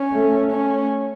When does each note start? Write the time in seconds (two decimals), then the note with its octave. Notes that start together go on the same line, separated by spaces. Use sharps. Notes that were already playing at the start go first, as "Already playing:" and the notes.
Already playing: C#4
0.12 A3
0.51 C#4